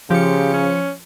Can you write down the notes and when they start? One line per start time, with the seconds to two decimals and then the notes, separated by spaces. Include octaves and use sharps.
0.10 C#3 F3 G4 C#7
0.54 C#4